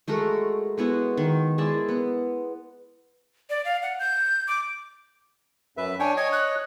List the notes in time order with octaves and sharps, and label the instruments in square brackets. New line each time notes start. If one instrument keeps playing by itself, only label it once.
[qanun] G#3 A3 F#4 A#4
G#3 B3 E4 F#4
D#3
G#3 E4 D5 A5
B3
[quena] D5
F5
F#5
G6
D6
[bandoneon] F#2 B4 E5
[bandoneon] D4 C#5 G5 [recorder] G#5
[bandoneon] C#5 D#5 [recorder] G#6
[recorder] F#6